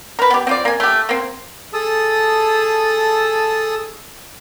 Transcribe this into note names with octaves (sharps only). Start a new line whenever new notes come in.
A#4 B4
B3 G4
C4 F4 D5
A#3 G#5
A3 G4
A#3 C4
G#4 A4 A5 D#6 E6